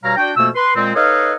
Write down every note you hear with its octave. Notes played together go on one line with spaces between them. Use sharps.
G2 B2 G3 C#5 F5 A#5
D4 F#4 G5
F2 B2 A3 A#3 E6
B4 C6
A#2 G#3 C4
D#4 A4 B4 C#5 D#5 F5